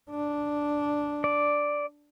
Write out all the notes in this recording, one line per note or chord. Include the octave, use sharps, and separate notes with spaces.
D4
D5